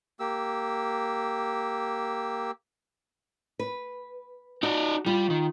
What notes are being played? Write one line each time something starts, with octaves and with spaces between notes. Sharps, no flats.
A#3 G4 E6
B4
D#4 F#4 D5
G3 F4
D#3